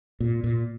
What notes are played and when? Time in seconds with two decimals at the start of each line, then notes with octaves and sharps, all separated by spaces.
0.20 A#2
0.44 A#2